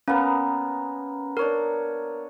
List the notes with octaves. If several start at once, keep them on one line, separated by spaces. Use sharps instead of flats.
A#3 B3 C#4 A#5
D4 A#4 C#5 D#6